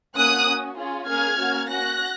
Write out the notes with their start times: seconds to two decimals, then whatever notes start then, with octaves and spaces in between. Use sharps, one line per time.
0.16 A#3 C#4 F#4 D#6 F#6
0.47 C#4 F#4
0.78 C#4 F4 G#4
1.08 A#3 C#4 G#4 F6 G#6
1.39 A#3 C#4 F#4
1.69 C#4 F#4 F#6 A#6